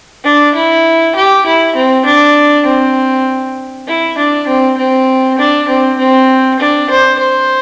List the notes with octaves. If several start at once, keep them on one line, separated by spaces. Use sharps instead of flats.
D4
E4
G4
E4
C4
D4
C4
E4
D4
C4
C4
D4
C4
C4
D4
C5
C5